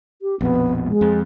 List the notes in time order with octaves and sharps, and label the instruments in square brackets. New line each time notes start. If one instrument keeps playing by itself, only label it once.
[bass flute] G4
[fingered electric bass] A#1 F2 B2 [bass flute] B3
[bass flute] G#3
[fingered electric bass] F2